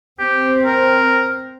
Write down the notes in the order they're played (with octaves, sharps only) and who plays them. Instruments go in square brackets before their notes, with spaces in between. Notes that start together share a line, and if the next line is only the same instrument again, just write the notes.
[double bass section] C4 [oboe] G4
[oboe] A#4